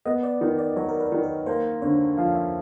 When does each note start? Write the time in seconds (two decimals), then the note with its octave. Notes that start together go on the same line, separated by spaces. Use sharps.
0.06 B3 D#5
0.23 D5
0.41 D#3 D#5
0.59 D5
0.76 F#3 C#5
0.89 A#4
1.00 B4
1.12 D#3
1.23 A#4
1.46 A#3 C5
1.82 D3 C#5
2.18 F3 F5
2.35 E5